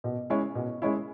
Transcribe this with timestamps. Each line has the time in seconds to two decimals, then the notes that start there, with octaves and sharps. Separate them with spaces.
0.04 B2
0.30 G#3 C#4 E4
0.55 B2
0.82 G#3 C#4 E4